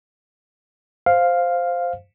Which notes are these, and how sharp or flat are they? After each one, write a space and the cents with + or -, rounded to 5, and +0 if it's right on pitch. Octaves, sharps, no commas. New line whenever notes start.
C5 +0 F5 +0